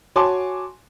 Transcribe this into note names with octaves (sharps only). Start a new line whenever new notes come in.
F#4 C#5 G#5 A5 C6 D6